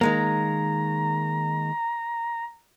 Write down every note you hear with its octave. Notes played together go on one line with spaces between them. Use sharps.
D#3 G#3 A#3 A#5